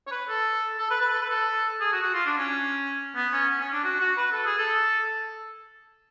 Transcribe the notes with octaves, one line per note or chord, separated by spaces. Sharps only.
C#5
B4
A4
A4
B4
B4
A4
B4
A4
G#4
F#4
F#4
F4
D4
C#4
B3
C#4
C#4
C#4
D4
F#4
F#4
B4
A4
G#4
A4